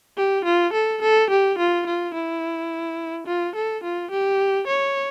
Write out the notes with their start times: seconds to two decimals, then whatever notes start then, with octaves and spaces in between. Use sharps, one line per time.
0.17 G4
0.45 F4
0.73 A4
1.02 A4
1.30 G4
1.58 F4
1.87 F4
2.14 E4
3.27 F4
3.55 A4
3.83 F4
4.11 G4
4.67 C#5